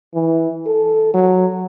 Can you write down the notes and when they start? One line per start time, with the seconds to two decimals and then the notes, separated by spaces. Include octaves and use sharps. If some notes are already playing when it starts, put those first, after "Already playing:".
0.15 E3
0.66 A4
1.14 F#3